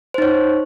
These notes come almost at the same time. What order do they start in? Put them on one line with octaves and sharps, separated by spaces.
C5 D#4 C#5